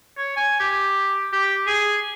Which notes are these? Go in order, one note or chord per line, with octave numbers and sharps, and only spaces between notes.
C#5
G#5
G4
G4
G#4